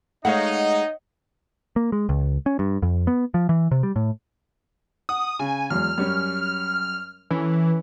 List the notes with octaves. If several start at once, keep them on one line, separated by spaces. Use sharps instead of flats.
G#3 A3 D#4 C#5 D#5 F5 F#5
A#3
G#3
C#2
C#4
G2
F2
B3
F3
E3
C3
G3
A2
F#5 D#6
C#3 G#5
E2 F#3 G#3 F6
F#2 G3 C#4
E3 C#4 A4